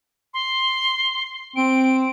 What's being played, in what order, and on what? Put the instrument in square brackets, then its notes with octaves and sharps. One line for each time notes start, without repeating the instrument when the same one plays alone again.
[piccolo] C6
[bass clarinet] C4 [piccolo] D7